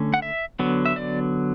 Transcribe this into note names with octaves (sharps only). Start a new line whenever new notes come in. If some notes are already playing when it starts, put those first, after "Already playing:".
Already playing: D3 A3 C#4
F#5
E5
D3 F#3 B3
E5
D5